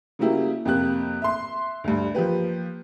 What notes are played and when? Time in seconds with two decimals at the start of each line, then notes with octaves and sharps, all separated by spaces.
0.19 C#3 F#3 G3 A#3 E4 G4
0.65 F2 C3 A#3 G4 F#6
1.22 E5 C6
1.84 D2 G2
2.15 F3 A#3 G4 B4